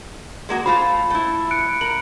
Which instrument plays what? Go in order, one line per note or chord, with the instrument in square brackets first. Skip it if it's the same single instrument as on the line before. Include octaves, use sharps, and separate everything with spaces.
[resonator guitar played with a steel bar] G#3 A#3 F#4
[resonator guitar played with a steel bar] A3 F4 C5 [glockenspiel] B5
[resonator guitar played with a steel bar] A3 E4
[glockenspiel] F#6 C#7 D7
[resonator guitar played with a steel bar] A#4 [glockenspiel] F#7